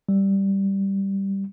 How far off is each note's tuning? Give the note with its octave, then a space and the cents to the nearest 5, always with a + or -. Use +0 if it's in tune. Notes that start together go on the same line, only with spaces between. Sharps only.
G3 -5